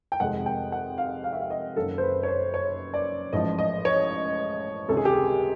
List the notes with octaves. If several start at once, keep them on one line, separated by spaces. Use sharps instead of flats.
G5
F2 C3 D#3 G#3 F#5
G5
F#5
F5
F5
E5
F5
D#5
F#1 F#2 D#3 A4
C5
B4
C#5
C5
C#5
D5
A1 G#2 F3 D#5
D#5
C#5
C#2 C3 D#3 A4
G#4
G4
G#4